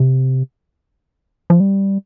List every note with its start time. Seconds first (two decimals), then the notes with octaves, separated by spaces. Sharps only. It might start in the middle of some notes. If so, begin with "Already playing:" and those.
Already playing: C3
1.50 F3
1.60 G3